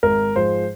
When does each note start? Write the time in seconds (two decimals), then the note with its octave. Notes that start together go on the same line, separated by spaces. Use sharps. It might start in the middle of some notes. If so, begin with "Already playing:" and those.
0.03 G#1 A#4
0.36 G#2 F3 G#3 C5